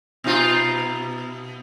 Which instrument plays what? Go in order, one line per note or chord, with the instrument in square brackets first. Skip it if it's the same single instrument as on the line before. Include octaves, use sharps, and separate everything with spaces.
[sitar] B2 D#4 F4